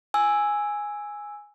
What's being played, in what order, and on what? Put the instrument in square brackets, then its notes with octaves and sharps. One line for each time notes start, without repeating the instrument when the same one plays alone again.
[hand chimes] G#5 E6